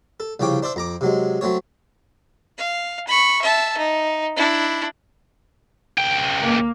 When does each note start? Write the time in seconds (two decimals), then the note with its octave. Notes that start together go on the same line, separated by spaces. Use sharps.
0.20 A4
0.40 C2 C#3 F3 C#5 G5 D6
0.63 D4 C5 D5 E5
0.76 F2 A#5 D6
1.01 C3 F#3 G#3
1.41 F#3 A3 C4 C#5
2.58 F5
3.07 B5 C#6
3.41 E5 A5
3.77 D#4
4.37 D4 E4
5.98 C#2 G5
6.42 A#3